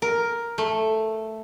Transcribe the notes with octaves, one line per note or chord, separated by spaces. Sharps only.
A#4
A3